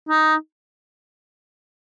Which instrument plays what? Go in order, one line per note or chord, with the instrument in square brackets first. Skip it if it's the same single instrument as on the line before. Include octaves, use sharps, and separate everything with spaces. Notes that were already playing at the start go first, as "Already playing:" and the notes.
[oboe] D#4